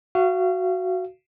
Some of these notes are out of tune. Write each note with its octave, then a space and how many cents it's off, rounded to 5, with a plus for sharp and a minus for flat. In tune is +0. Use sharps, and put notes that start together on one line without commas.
F#4 +0 F5 -35